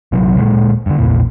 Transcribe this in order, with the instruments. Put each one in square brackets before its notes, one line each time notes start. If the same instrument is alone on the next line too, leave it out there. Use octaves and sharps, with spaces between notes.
[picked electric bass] A#1 C3 E3 F#3
D1 A#2 G#3
G2 D3
A#1 E2 A#2 E3